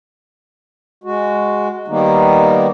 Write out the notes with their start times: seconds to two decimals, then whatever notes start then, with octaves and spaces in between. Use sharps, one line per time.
1.04 G#3 F#4
1.88 D#3 G3 A#3 B3 D#4